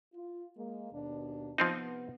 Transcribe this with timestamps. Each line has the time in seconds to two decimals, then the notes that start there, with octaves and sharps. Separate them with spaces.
0.14 F4
0.57 G#3 A#3
0.92 D#2 B2 D4
1.58 C3 F3 B3 C4 D#4